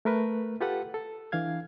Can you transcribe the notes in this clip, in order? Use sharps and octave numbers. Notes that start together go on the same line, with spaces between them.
A3 A#4 B4
F4 G4 A4 B4 F#5
A4
E3 D4 F5 G#6